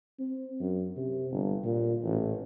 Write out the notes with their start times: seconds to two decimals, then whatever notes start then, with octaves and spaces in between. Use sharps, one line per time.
0.19 C4
0.60 F#2
0.97 C3
1.32 G1
1.64 A#2
2.04 A1